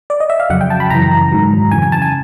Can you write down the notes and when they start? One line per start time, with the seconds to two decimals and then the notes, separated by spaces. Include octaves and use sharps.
0.10 D5
0.20 D#5
0.30 E5
0.40 F5
0.50 F2 C#3 F#3 F#5
0.61 G5
0.70 A5
0.80 B5
0.90 F#2 C#3 E3 A#5
1.32 G#2 D#3 F#3
1.71 F2 C#3 E3 G#5
1.82 G#5
1.92 A5
2.02 G#5